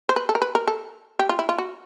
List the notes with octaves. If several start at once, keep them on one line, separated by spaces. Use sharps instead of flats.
C5
B4
A4
A#4
B4
A#4
A4
G4
F4
E4
F4
F#4